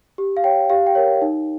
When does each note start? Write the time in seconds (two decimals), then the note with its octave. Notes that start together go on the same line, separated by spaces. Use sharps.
0.18 G4
0.37 F5
0.44 C#5 G5
0.70 G4 F5
0.87 G5
0.95 A#4 C#5
1.22 D#4